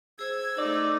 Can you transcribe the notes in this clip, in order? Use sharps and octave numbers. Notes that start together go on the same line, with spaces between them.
G#4 C5 E6 G#6
A3 D#4 D5